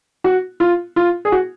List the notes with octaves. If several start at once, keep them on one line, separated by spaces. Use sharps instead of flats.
F#4
F4
F4
G#4
F#4